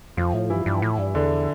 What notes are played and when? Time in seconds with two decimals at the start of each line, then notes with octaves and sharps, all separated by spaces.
0.17 F2 F3 F4
0.34 A2
0.50 G2 E3 E4
0.66 G2
0.82 A2
0.98 G2
1.14 E2 D3 D4